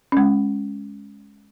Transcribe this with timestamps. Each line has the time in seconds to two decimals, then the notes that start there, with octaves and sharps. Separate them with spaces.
0.12 G#3 C#4